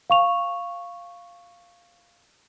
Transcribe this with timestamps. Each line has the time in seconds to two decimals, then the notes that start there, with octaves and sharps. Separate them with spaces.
0.10 F5 C#6 F7